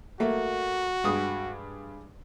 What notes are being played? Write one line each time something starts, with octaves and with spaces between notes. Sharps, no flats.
A3 A#3 F#4
G2 G#3 D#6